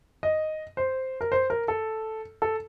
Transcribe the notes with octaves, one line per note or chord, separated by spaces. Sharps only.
D#5
C5
A#4
C5
A#4
A4
A4